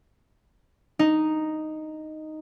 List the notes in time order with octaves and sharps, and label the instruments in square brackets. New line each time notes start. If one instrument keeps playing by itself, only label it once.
[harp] D#4